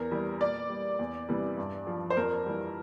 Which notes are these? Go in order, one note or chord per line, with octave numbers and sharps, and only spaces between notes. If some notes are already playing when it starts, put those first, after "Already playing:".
Already playing: E2 A#4
E3 G3
A#2 D5
G3
E2
C3 E3 G3
G2
F3
C5
F2 A#4
E3 G3